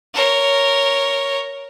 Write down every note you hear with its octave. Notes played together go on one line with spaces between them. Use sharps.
A#4 C#5